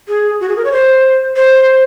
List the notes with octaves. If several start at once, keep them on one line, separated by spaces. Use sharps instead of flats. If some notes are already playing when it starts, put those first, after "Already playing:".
G#4
F#4
G#4
A#4
C#5
C5
C5